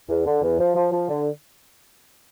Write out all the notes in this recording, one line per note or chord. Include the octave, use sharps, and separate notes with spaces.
E2
D3
E2
F3
F3
F3
D3